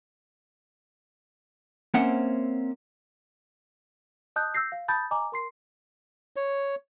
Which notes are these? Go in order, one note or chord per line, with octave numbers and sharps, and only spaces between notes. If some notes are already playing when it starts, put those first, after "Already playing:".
A#3 C4 C#4 C5 E5 F#5
D#5 A5 D#6 F#6 G6
E6 G6 A#6 C7
F5
A5 B5 D#6 G6 A6
D#5 G#5 A#5 D6
A#4 C6 C7
C#5